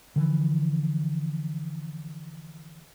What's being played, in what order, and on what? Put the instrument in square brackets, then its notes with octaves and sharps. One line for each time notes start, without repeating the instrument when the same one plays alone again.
[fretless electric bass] D3 E3 F3